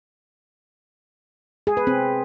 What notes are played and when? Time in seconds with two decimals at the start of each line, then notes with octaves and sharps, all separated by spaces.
1.67 G#4
1.77 B4
1.87 C4